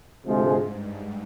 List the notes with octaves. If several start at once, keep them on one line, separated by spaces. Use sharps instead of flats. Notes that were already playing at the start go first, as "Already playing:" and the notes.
D2 G#2 C3 F3 G#3
G2